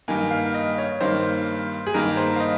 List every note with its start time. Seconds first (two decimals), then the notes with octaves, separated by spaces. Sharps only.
0.08 G2 D#3 A#3 G#5
0.31 F5
0.54 D#5
0.78 C#5
1.00 G2 D#3 A#3 C5
1.87 G#4
1.94 G2 D#3 A#3 A#4
2.17 C5
2.36 F5
2.40 D#5